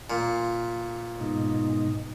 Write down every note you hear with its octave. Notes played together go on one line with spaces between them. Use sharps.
A#2
G#2 B2 D#4